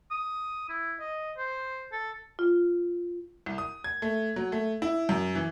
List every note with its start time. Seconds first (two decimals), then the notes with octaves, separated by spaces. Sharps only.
0.11 D#6
0.69 E4
1.00 D#5
1.37 C5
1.92 A4
2.39 F4
3.46 C2
3.58 D#6
3.84 G#6
4.02 A3
4.36 F#3
4.52 A3
4.82 E4
5.09 F#2
5.35 E3